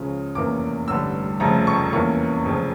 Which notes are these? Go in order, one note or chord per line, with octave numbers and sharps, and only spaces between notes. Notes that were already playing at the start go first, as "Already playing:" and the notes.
Already playing: C#2 C#3 F3 C#4
F1 E2 E3 A#3 C#4 D6
A1 G2 D3 G3 E6
F1 F2 C#3 F3 A3 A#5
C#6
E2 E3 A#3 C#4 C#6
F1 F2 C#3 F3